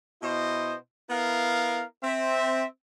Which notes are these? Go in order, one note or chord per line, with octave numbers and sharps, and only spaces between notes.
B2 E4 C5 D#5
B3 E4 A#4 F5
C4 E5